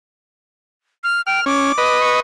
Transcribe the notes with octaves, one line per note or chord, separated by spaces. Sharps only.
F6
G5 F6
C#4 D6
B4 D#5
C#6